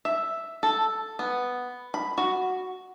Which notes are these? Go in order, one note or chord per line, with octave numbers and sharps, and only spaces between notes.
E5
A4
B3
B5
F#4